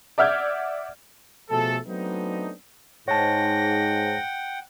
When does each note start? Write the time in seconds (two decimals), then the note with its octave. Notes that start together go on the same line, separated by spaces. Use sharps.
0.18 D5 E5 F#5 F6 G6 G#6
1.50 B2 F3 A3 G#4 A4
1.87 F#3 A3 B3 C4 D4 D#4
3.08 G#2 C#5 F#5 G5 A5 A#6